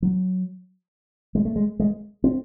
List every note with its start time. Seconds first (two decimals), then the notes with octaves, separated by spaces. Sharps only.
0.02 F#3
1.35 G#3
1.45 A3
1.56 G#3
1.80 G#3
2.24 C4